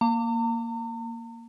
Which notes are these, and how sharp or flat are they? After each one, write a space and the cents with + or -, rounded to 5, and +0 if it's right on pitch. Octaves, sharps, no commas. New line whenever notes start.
A#3 +0 A#5 -45